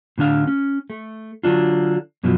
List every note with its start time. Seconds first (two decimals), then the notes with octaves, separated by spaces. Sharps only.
0.18 A2 D3 D4 F5
0.47 C#4
0.90 A3
1.43 D3 F#3 D4 F4
2.23 F#2 B2 F3 F#3